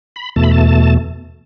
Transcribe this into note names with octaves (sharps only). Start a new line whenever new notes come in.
B5
E2 B2 A3 A5
B5
A5